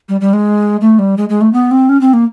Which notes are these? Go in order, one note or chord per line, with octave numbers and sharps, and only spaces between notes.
G3
G3
G#3
A3
G3
G#3
G#3
A3
B3
C4
C#4
C4
A#3